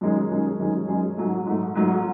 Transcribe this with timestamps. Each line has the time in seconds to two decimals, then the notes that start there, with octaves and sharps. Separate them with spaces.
0.01 F#2 D#3 G#3 C#4 G#4
0.30 F#2 D#3 G#3 C#4 G#4
0.59 F#2 D#3 G#3 C#4 G#4
0.88 F#2 D#3 G#3 C#4 G#4
1.17 G#2 F#3 A3
1.46 G#2 F#3 A3
1.75 G#2 F#3 A3